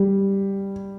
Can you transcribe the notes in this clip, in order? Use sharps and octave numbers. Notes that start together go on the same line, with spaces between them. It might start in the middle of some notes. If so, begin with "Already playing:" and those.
Already playing: G3